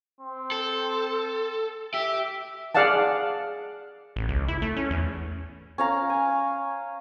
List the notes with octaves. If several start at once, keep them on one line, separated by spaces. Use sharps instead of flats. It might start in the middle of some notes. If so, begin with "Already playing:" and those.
C4
A4
G4 E5
G#4 D5 F5 F#5 A5
A1
C#2
E4
A3
C#4
E2
C#4 F5 A#5
G#5